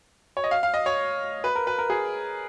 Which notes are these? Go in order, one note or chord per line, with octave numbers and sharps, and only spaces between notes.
C#5
D#5
F5
F5
D#5
C#5
B4
A#4
B4
A#4
G#4